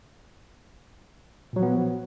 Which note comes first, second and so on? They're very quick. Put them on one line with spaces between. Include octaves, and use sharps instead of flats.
A#2 F#3 F3 B3